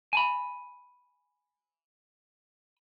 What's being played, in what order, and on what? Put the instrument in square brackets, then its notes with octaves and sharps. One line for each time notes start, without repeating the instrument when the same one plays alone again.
[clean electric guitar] G#5 A5 B5